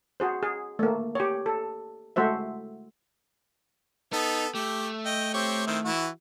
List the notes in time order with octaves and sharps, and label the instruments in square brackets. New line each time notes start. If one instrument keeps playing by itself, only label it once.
[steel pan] F#4 G#4 C5
G#4
A3 A#3
G4 C#5
A4
G#3 A3 F#4 C5 E5
[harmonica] B3 A4 [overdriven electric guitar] D#4
[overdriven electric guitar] A3 [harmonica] G4
[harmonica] D#5 G5
C4 G4 C#5
D#3 C4 E4
E3 E4 F#4